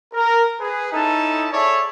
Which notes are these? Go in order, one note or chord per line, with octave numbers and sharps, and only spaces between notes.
A#4
G#4 B4
C#4 D#4 E4 A4 A5
G#4 A4 C#5 D5 E5